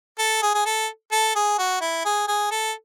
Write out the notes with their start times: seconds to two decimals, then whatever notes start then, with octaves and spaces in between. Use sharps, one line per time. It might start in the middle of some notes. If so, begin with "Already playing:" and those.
0.19 A4
0.42 G#4
0.55 G#4
0.66 A4
1.12 A4
1.36 G#4
1.58 F#4
1.81 E4
2.05 G#4
2.28 G#4
2.51 A4